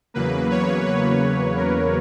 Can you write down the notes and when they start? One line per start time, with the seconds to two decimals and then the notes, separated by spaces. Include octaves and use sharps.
0.14 E2 C#3 F#3 A#3 B4
0.51 C#5
0.86 B4
1.57 A#4